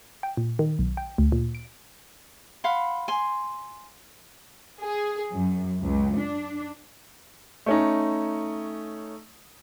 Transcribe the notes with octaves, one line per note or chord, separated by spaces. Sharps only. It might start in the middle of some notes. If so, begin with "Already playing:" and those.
G5
A#2
D#3
B1
G5
D2
A#2
D7
F5 F#5 B5 C6
G#5 C6
G#4
F#2
C#2
D4
A3 C#4 D#4